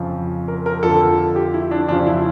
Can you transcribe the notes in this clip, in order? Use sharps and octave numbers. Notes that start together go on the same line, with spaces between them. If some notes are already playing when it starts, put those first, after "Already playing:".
Already playing: F2 C#3 F3
A#4
A#4
F2 D3 F3 A4
G4
E4
D4
F2 C#3 F3 D4
E4